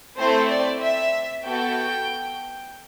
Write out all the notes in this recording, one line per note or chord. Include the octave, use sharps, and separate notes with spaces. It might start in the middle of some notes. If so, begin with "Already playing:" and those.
A3 C4 E4 A4 C5
D5
E5
B3 F#4 A4 G5